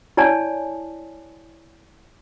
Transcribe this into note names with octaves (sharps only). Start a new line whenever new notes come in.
E4 C#5 D5 G#5 A5